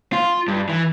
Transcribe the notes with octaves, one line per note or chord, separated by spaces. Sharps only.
F4
G2
E3